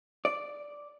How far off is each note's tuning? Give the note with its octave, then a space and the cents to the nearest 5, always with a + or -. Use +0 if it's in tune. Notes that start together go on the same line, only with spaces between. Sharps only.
D5 -5